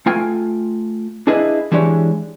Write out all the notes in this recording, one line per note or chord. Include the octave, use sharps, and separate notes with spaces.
A3 F4 G5 G#5
D4 E4 G#4 B4 D#5
E3 G#3 D4 G4 C#5